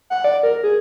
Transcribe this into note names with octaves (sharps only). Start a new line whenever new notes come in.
F#5
D5
A#4
G#4